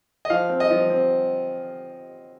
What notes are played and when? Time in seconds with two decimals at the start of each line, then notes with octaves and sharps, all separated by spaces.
0.25 D#5
0.30 F3 F5
0.49 C4
0.60 D#5
0.70 F3
0.90 C4